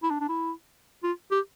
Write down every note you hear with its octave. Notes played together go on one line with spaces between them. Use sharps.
E4
D4
D4
E4
F4
G4